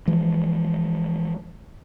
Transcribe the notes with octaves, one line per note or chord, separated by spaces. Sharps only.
E3 F3 G#3